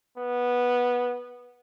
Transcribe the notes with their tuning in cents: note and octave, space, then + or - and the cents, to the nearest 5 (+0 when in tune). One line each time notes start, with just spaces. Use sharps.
B3 -10